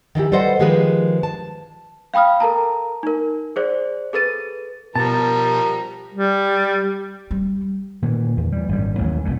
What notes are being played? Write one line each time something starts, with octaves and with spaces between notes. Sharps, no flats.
D#3 E3 E4 G4
G3 A4 B4 C5 D#5 F#5
D#3 F3 G#3 G4 G#4 B4
A5
F5 G5 B5 D#6 F6
A4 A#4 A5 A#5
D#4 A#4
G#4 C5 D5
G#4 A4 B4 A6 D#7
B2 F3 G3 A#4 A5 A#5
G3
G3
A#2 D#3 E3
E2 D#3
E3 G3
G#1 F#2 G3
A1 D#2 F#3
E1 C2 F2 A2